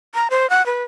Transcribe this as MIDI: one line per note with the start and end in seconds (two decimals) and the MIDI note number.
0.15 0.28 82
0.30 0.49 72
0.50 0.64 78
0.66 0.84 71